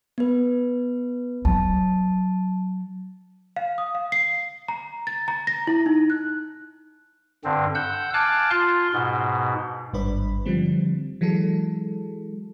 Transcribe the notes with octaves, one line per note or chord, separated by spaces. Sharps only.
B3 B4
F#3 A5
F5
D#6
F5
C7
A#5
A6
A#5
A#6
E4
D#4
F#6
G2 D3 C4
F#5 E6 G6
F5 G#5 A5 D6 F#6
F4 C6
G#2 B2
G#1 G2 D4 B4 B5
D3 F3 G3 C4
E3 F#3 G#3 A4